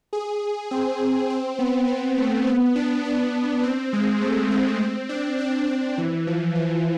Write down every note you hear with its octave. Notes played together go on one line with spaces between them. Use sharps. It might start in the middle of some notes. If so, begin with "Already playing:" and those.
G#4
C4
C4
B3
B3
A3
B3
D4
D4
C4
G#3
A3
C4
C4
D4
D4
D4
E3
F3
E3